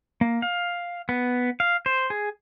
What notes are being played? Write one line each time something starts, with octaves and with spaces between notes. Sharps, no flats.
A#3
F5
B3
F5
C5
G#4